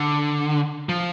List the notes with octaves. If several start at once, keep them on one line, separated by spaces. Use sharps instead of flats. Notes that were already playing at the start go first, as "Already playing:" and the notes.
Already playing: D3
F3